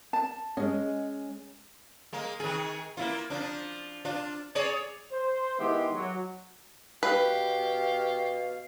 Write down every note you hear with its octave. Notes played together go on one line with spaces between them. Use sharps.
A5
G#3 C#4 D#5
G#3 A#3
D#3 G#4
A#3 E4 F4
F3 D4
D4 F4
G#4 C#5 D5
C5
D#3 G#3 B3 E4 G4 C6
F#3
B2 G4 B4 F5